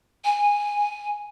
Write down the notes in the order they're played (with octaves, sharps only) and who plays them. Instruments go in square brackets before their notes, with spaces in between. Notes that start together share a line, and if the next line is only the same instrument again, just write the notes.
[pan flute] G#5